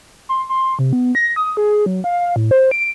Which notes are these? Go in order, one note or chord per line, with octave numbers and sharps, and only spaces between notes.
C6
C6
C3
B3
A#6
D#6
G#4
F#3
F5
A2
C5
D7